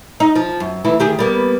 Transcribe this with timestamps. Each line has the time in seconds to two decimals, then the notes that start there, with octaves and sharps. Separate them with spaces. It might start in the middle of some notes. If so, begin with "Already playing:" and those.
0.20 D#4
0.36 F3
0.60 F#2
0.85 D2 E3 E4
1.00 D#3 G4 G#4
1.19 G3 A#3 B3